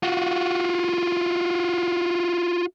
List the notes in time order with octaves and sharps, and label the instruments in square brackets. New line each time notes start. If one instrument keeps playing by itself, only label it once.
[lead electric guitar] F4 F#4